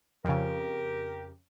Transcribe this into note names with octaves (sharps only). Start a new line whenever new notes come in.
F2 C#3 G4 A#4